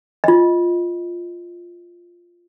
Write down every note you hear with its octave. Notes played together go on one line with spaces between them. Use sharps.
F4 D#5